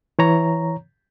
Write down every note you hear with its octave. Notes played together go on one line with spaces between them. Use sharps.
E3 C#5 A#5